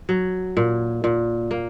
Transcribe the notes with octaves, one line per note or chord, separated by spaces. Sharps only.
F#3
A#2
A#2
A#3